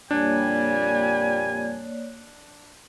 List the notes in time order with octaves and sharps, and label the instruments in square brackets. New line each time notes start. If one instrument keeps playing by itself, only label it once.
[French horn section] F2 A#2 G3 [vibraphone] A#3 C#5 D5 [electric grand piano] D4 [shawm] G#5